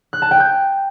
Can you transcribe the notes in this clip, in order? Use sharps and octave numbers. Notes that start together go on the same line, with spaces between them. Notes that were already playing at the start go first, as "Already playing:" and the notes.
F#6
A5
G5
G6